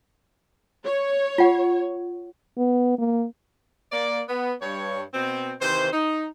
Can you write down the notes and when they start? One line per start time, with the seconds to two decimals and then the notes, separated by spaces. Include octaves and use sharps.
0.85 C#5
1.38 F4 F#5
2.58 B3
2.99 A#3
3.92 A#3 D5
4.28 B3
4.62 G2 C#5
5.14 B2 C4
5.61 C3 D#3 E3 C5
5.93 D#4